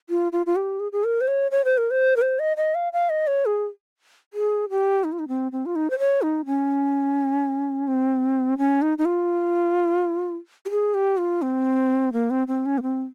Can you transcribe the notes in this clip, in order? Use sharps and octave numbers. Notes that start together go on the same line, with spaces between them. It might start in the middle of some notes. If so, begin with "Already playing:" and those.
F4
F4
F4
G4
G#4
G#4
A#4
C5
C#5
C#5
C5
A#4
C5
A#4
C5
D#5
D#5
F5
F5
D#5
C#5
G#4
G#4
G4
D#4
F4
D#4
C4
C4
F4
D#4
C5
C#5
D#4
C#4
C4
C#4
D#4
D#4
F4
G4
G#4
G4
F4
C4
A#3
C4
C4
C#4
A#3
C4